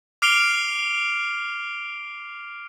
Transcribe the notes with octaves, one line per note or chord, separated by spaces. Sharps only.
D6 F6 C7 D7 F7 G7